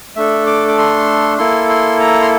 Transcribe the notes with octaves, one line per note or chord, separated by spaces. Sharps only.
A3 D4 A4 E5
D6
D6
C6
A#3 E4 A4 C6
C6
A#5
C6